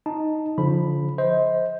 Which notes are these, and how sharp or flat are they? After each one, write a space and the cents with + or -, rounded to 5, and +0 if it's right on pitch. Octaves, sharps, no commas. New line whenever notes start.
D#4 +0 A5 +0
D3 -40 F3 +0 B5 +0
C5 +0 D#5 +35